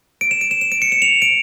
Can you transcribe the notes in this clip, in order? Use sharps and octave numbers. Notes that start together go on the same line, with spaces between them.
D7
E7
D7
E7
E7
D7
C#7
E7
F7
D7